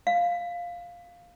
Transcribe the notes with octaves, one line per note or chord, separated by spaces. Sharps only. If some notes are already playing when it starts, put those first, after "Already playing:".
F5